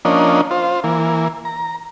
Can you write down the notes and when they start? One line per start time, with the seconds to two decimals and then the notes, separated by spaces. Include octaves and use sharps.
0.05 F3 A#3 C#4 D4 D#5
0.51 F4 C5
0.84 E3 A#3
1.45 A#5